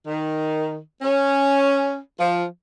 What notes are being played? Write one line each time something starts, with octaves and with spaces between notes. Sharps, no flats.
D#3
C#4
F3